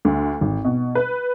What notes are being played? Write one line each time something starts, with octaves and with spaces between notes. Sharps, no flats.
D2
G#1
B2
B4